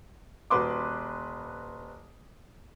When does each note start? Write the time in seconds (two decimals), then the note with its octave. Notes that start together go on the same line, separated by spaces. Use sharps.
0.50 D#1 F#4 B4 C6 D6